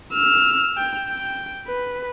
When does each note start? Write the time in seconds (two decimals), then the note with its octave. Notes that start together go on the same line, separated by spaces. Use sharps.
0.13 E6 F6
0.77 G5
1.10 G5
1.67 B4